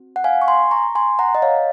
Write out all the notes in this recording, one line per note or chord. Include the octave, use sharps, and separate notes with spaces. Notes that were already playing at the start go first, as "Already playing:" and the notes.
Already playing: C4 F#4
F#5
F5 G#5
C#6
G#5 C6
A#5 C#6
G#5 C6
F#5 A#5
D#5
C#5 F5